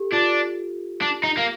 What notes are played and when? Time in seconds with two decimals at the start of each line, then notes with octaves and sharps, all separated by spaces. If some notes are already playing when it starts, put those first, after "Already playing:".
Already playing: G4 A4
0.12 D4 F4
1.02 D4
1.23 D#4
1.37 A#3